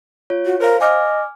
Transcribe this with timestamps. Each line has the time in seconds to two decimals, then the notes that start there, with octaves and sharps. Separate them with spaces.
0.30 F4 C#5
0.45 F#4
0.60 A#4 C5 F5
0.81 D#5 G#5 D6 F6